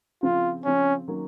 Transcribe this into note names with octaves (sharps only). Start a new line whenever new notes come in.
C#3 F3 C4 F4
C#3 F3 C4 C#4
D#3 F#3 A#3 C#4